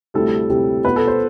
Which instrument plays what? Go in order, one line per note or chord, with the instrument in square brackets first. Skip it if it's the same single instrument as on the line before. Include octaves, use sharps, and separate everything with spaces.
[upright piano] D2 C3 G3 C4 E4 A4
D2 C3 G3 C4 E4
B2 B3 F4 B4
A4
C5